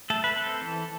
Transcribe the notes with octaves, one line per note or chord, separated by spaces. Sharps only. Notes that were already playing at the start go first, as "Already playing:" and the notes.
A3 A4
B4
C4 A4
E3